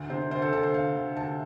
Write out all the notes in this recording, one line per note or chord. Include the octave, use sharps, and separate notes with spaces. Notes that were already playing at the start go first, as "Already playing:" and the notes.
Already playing: D2
C3 C5
D2 C5
A4
D2 A4
C5
D2 F5
D2
D2 A5